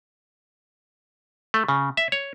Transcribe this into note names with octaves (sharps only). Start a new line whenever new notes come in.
A3
C#3
E5
C#5